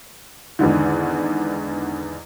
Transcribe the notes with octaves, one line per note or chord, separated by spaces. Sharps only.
E2 G#2 D3 D#3